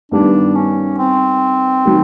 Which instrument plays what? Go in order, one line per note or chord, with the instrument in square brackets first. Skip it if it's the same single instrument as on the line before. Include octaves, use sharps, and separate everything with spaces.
[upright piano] G2 D#3 G3 B3 [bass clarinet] D4
[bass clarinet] C#4
C4
[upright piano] D#3 F#3